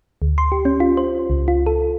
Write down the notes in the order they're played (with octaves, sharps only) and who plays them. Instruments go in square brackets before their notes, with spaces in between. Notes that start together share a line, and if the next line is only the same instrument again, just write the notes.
[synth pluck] D2
C6
G4
C#4
F4
C5
C#2
F4
A4